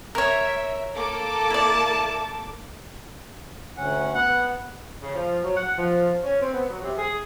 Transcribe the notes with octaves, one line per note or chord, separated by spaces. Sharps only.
A#4 C#5 E5
A#3 A4 A5 D6
E4 D5
D2 C#4 F#5
B3 F#5
C#3
F3
F#3
F#5
F3
C#4
C4
B3
F#3
C3
G#4